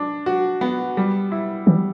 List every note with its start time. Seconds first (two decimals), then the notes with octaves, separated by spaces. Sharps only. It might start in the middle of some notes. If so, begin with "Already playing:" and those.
Already playing: D4
0.26 F#4
0.61 B3
0.97 G3
1.32 E4
1.67 E3 G3